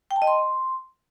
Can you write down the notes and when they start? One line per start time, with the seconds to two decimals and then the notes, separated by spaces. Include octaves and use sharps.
0.11 G5
0.16 A5
0.22 D#5
0.27 C6